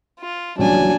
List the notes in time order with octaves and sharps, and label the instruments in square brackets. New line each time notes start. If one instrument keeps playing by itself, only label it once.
[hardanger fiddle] F4
[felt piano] D#1 A1 C#3 [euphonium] F#3 [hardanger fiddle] D4 G#5